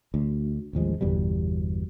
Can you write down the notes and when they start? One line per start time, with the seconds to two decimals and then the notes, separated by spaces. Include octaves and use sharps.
0.14 D2
0.73 A1 D#2 F3 G#3
1.01 G1 E2 B2 G3